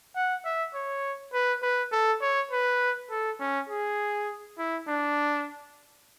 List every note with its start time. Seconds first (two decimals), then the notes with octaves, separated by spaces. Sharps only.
0.16 F#5
0.45 E5
0.74 C#5
1.33 B4
1.63 B4
1.92 A4
2.21 C#5
2.51 B4
3.10 A4
3.40 C#4
3.69 G#4
4.58 E4
4.88 D4